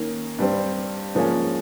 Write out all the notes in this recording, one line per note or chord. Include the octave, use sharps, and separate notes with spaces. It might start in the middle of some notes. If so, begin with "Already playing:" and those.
Already playing: D#3 A#3 C#4
G2 G3 C4
G#2 F3 A#3 C#4